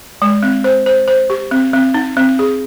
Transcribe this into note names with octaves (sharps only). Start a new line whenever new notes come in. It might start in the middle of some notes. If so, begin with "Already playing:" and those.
G#3
C4
C5
C5
C5
G4
C4
C4
D#4
C4
G#4